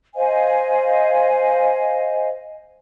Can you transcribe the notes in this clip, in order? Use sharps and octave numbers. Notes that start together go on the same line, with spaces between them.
C5 D#5 F5 G#5